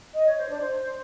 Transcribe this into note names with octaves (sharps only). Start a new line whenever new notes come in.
D#5
C#5
C5
D4
C5